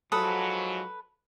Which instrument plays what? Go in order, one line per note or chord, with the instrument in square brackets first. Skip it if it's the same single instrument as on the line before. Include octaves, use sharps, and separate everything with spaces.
[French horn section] G#2 F3 F#3 [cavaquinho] A4 B4 D#6